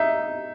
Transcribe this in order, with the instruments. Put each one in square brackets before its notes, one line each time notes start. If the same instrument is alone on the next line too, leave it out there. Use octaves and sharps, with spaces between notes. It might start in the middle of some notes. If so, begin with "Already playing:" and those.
Already playing: [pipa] D#4 [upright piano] E5